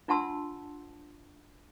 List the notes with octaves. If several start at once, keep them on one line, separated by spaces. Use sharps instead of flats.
D4 F4 F#5 A5 C6 E6